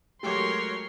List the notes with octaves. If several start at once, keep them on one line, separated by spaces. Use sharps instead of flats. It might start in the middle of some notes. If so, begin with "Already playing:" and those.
F#3 G#3 A3 F#4 G4 A#4 C#5 C6